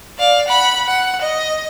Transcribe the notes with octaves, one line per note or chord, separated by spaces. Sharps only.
D5 F5
F#5 B5
F#5
D#5